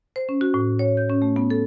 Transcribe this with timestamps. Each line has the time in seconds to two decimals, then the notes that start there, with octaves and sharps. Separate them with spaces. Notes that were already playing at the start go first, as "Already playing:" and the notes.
0.16 C5
0.29 C#4
0.41 F#4
0.54 A2
0.79 C#5
0.97 G6
1.10 C#4
1.22 A3
1.36 B3
1.50 A4